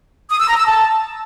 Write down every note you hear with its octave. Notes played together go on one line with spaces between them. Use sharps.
D#6
E6
A#5
E6
A5